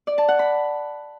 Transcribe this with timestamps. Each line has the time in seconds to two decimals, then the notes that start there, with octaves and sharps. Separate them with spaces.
0.07 D5
0.18 A5
0.28 F#5
0.39 B5